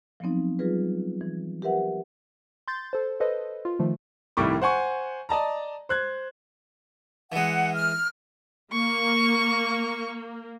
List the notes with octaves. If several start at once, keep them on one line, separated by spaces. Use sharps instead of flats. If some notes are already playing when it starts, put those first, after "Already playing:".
F3 F#3 A3 B3 C4 D#4
F#3 G3 F4 G#4 B4
E3
G4 A#4 B4 E5 F#5
C6 G6 A6
A4 C5
A4 B4 C5 D#5
F4
D#3 F3 A3
C2 A2 D#3 G3 C#6 D6
C5 F#5 G#5 C#6
D5 D#5 A5 A#5
C5 F#6 G#6
E3 G#3 F#5
F6
A#3 C#6